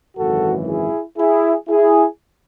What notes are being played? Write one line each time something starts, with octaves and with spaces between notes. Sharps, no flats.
G#1 F#2 C#3 E3 F#4 A4
E4 G#4
E4 G#4
E4 G#4